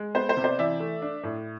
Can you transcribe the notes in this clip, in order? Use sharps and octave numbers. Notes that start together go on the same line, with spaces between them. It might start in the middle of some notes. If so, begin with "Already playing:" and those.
Already playing: G#3
B3 C5
C5
C3
C5 D5
E3 D5 E5
A3
D4
A2